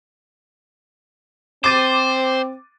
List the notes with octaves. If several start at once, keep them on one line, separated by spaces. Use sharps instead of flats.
C4 C5 D6 A6 D#7